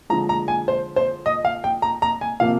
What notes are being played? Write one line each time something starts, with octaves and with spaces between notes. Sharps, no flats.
D3 F3 G#3 A#5
A#5
G#5
C5
C5
D#5
F5
G5
A#5
A#5
G#5
C3 F3 A#3 F5